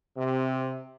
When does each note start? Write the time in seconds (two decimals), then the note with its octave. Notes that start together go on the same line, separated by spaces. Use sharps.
0.17 C3